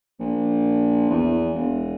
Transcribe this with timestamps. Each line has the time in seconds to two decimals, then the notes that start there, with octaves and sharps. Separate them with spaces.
0.19 A#1
1.10 E2
1.54 E1